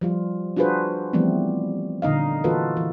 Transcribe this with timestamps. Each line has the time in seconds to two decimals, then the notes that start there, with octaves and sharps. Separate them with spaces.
0.01 F3 G3 F4
0.56 D4 F4 F#4 G#4 B4 C5
1.13 E3 F3 G3 A3 B3 C4
2.02 A#2 D3 D#4 D#5 F5
2.44 E3 A#3 F4 F#4 A4 B4
2.77 E3